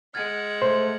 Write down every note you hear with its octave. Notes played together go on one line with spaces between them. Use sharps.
G#3 F#5 F6 G#6 A6
A3 C5